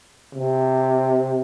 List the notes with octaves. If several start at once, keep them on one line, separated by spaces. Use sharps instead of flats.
C3